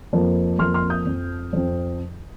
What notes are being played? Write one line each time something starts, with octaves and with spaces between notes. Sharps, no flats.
F2 F3 A#3
F2 F3 A#3 C6 F6
C6 F6
D#6 G6
F2 F3 C4
F2 F3 C4